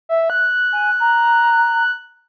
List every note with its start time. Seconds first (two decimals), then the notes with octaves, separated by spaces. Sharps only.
0.09 E5
0.30 F#6
0.72 G#5
1.00 A#5